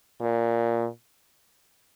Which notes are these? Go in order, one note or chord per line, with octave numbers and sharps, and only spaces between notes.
A#2